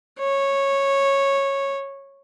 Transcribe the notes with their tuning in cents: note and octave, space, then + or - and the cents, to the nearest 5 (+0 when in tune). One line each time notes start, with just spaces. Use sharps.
C#5 -10